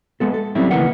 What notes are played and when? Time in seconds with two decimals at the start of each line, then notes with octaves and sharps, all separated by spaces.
0.20 G#3 B3 A4
0.34 A4
0.55 F#3 G3 C4 C#4 E4
0.71 C#2 D#3 E3 A#3 B3 F#5